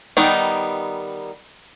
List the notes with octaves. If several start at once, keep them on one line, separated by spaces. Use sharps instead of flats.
D#3 G3 B3 D#4